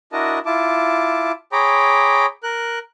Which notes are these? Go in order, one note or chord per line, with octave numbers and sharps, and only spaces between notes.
D4 E4 F#4 A#4 D#5 A5
E4 F4 A5 D6
G#4 C#5 G5 A#5 B5 D6
A#4 F#6